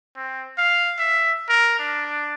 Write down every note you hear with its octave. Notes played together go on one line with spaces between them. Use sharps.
C4
F5
E5
A#4
D4